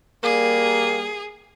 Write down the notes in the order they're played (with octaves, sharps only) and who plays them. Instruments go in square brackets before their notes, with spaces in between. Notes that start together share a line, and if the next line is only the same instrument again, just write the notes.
[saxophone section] G3 A#3 [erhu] G#4